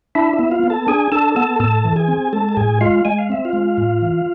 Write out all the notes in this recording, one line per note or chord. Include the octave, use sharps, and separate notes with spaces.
D4 E4 E5
E4 E5
B3
F4 F5
B3
A4 A5
D4 G#4 G#5
D4 A4 A5
B3 A4 A5
A2 A4 A5
E3
G#4 G#5
C4
G#3 A4 A5
A5
A2 G#4 G#5
G#3 F4 F5
G#3 G#5
F5
C4 E5
F4 F5
G#3
A2
E3